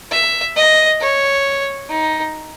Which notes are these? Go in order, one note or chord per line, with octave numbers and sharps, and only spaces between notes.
E5
D#5
C#5
D#4